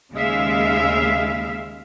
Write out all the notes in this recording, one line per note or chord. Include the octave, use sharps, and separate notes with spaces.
D#2 C#3 G#3 E5 F5